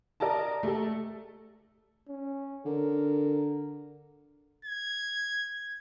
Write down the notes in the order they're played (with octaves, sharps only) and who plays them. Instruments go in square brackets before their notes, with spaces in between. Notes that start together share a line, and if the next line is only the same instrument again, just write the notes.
[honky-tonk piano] A#4 D5 D#5 A5
A3 A4
[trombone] C#4
[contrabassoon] D3 [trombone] A#4
[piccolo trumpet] G#6